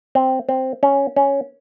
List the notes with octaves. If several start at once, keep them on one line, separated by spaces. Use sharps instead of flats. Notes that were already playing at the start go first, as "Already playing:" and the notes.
C4
C4
C#4
C#4